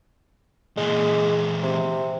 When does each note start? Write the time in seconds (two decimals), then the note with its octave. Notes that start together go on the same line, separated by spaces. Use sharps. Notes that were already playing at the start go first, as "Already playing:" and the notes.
0.77 A#2 E3 G#3
1.63 C3